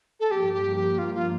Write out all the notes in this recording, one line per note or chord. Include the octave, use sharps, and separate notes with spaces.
A4
G2 F3 A#3 G4
G4
G4
F4
F4